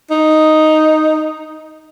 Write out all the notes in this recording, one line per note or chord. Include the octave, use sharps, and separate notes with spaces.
D#4